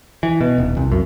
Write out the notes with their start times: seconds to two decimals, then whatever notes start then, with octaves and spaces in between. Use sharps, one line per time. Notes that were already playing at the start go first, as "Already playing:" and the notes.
0.23 E3
0.41 B2
0.58 D#1
0.77 C2
0.92 F#2